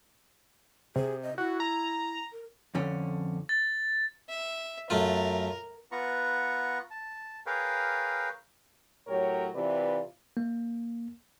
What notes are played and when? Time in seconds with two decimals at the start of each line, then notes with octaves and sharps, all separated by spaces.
0.96 C3 G#4
1.23 D#5
1.38 E4 F#4
1.60 A#5
2.32 A#4
2.75 F2 D3 C#4
3.49 A6
4.29 E5
4.90 F#2 A3 F4 A#4
5.92 B3 F4 B4 F#5 A#5 C#6
6.91 A5
7.46 G#4 A#4 B4 C#5 F5 G5
9.07 A2 F#3 G4 A#4 C#5
9.55 C3 E3 F4 B4 D5
10.37 A#3